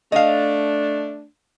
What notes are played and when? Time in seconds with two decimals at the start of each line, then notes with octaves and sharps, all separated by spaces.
0.12 A3 D4 D#5 F5